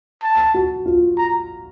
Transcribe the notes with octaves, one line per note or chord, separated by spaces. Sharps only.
A5
F#4
F4
A#5